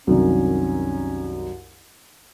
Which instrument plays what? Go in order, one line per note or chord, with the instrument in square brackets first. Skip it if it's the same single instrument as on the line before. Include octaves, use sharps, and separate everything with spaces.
[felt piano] C2 F#2 D#3 [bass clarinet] C#4